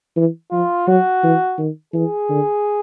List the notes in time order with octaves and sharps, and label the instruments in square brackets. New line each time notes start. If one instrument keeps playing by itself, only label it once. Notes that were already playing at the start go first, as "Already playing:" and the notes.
[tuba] E3
[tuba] F3 [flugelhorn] F4
[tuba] F#3 [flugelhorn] F#4
[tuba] E3
D#3
[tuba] E3 [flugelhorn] G#4
[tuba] D3